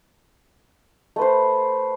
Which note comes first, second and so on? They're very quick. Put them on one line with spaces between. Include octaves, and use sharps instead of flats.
A3 B4 C5